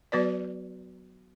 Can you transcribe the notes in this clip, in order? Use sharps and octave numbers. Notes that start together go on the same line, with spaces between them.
F#3 B3 F#4 B4 D5